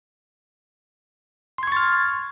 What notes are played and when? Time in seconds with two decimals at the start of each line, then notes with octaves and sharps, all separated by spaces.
1.58 C6
1.63 G#6
1.67 C#6
1.72 A6
1.77 F6